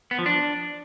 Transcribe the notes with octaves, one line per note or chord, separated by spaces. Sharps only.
B3
F3
D4